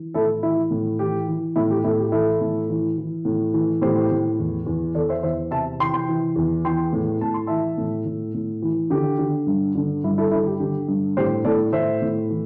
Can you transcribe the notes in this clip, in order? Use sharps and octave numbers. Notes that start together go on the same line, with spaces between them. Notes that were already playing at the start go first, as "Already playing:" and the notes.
Already playing: E3
A2 E4 A4
E3 E4
A2
E3 G4
E3
A2 E4
G4
A2 E4 A4
G4
E3 E4 A4
A2
E3
E3
A2
E3
A2 G4 C5
A2
E2
E2
E2 A4 D5
C5 E5
E2 C5 E5
C3 E5 A5
E3 G5 C6
G5 C6
E3
E2
E3 G5 C6
A2
A2 A5
C6
E3 E5 A5
A2
A2
A2
E3
D3 G4
D3
G2
D3
G2 E4
E4 A4
D3 E4 A4
G4
D3 G4
G2
A2 G4 C5
A2 A4 D5
A2 C5 E5
A2
E3